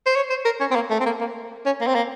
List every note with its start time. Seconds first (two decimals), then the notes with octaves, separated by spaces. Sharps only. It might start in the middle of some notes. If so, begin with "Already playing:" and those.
0.06 C5
0.16 C#5
0.30 C5
0.45 A#4
0.60 C#4
0.71 C4
0.75 A#3
0.90 A3
1.00 C4
1.06 A#3
1.21 A#3
1.66 C#4
1.81 A#3
1.87 C4
1.95 A#3